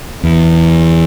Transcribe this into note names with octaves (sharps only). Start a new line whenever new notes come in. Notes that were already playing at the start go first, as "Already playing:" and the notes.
E2